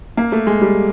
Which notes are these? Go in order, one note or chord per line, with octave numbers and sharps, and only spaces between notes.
A#3
A3
G#3
G3